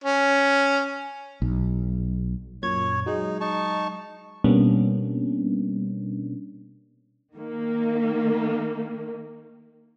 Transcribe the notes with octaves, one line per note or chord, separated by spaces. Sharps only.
C#4
B1
F#2 A#2 C#5 G#6
F#3 G#3 D#4
D#4 A5 C#6
B2 G3 A#3 B3 C#4 D4
D#3 A#3